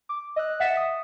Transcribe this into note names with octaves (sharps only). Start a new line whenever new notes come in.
D6
D#5 E6 F#6
E5 F#5 A6 B6 C#7 E7
D#6